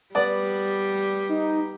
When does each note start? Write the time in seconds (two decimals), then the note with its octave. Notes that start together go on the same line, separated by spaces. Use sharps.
0.15 G3 B3 D5
1.29 D#4